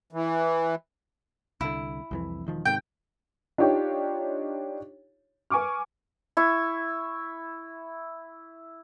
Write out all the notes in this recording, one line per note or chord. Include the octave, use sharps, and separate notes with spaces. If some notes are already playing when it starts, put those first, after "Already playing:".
E3
C2 D3 E4
C2 F2 E3
E1 D#3 F3
G#2 C3 D#3 G5
D4 D#4 F4 G4 C#5
B4 G#5 C#6 D6 F6
E4 C#6